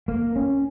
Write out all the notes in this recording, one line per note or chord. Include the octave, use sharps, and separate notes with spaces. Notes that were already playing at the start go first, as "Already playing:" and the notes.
A#3
C#4